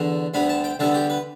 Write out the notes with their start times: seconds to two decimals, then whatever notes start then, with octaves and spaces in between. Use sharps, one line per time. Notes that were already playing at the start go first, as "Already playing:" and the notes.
Already playing: E2 D3
0.34 D2 D3 G3 B3 B5
0.49 A5
0.64 G5
0.79 D2 D3 G3 B3 A4
0.94 G4
1.10 B4